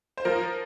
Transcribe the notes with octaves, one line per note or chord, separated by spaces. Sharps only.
C5
F3 A#4